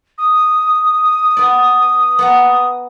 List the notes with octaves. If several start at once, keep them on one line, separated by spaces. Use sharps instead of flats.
D#6
B3 B4 D5
B3 F#5 A#5